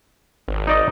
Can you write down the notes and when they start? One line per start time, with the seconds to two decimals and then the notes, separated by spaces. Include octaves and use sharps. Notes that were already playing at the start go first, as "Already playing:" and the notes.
0.48 G#1
0.67 D#4 D5 D#5